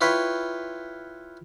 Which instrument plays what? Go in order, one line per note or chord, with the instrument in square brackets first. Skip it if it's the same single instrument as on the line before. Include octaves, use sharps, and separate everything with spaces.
[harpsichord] E4 F4 B4 C#5 E5 G5